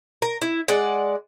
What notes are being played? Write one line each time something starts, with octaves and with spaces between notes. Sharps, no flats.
A#4
E4
G#3 D5 F#5